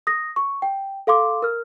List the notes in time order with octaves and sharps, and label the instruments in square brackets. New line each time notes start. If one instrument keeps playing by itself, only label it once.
[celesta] D#6 A#6
C#6
G5
A4 F5 C6 D6
A#4 F6